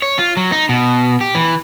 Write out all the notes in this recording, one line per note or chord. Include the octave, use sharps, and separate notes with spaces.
C#5
F4
F#3
D#4
B2
G4
E3